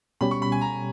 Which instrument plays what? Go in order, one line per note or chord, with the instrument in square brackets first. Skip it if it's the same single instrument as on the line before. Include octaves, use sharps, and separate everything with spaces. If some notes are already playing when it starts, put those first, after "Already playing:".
[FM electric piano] B2 G3 C#4 G4 [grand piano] B5
[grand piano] C#6
B5
G#5
A#5